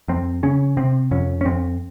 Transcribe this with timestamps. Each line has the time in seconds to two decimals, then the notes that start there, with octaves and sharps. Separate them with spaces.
0.08 F2 C4
0.43 C#3 C#4
0.77 C3 C4
1.11 F2 C#4
1.41 C#4
1.45 F2 C4